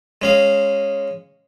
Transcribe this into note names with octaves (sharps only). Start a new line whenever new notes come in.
G#3 C#4 F5